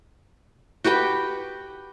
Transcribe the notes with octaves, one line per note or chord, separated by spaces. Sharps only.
F#4 G4 B4 G5